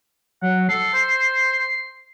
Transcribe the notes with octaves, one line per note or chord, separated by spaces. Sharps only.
F#3 F#5
A4 C7
C5